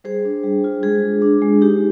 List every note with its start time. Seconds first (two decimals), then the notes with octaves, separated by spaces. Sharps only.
0.04 G3 G#4 C5
0.25 D4
0.43 G3
0.64 F4
0.83 G#3 G#4
1.03 D4
1.22 D4
1.42 G#3
1.61 D#4 G4